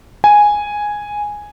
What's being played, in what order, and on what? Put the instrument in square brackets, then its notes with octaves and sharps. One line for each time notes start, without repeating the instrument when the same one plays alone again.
[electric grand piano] G#5